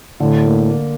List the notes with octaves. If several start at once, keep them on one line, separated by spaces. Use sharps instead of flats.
A2 D3
A#3
A#3